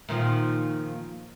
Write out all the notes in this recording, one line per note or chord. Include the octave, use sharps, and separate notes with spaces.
A#2 D#3 F3